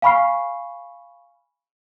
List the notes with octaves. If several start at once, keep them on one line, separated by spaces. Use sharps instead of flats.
F5 G#5 B5 C#6 F6 C7